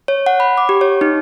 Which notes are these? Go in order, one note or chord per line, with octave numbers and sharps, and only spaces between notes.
C#5
F#5
B5
D6
G4
C#5
D#4